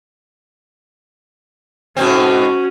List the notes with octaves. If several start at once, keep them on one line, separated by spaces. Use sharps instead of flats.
G#2 B2 C4 C#4 F#4